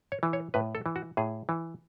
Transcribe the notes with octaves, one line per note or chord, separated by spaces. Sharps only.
C#5
E3
C#5
A2 B4
A4
E3
F#4
A2 G#4
E3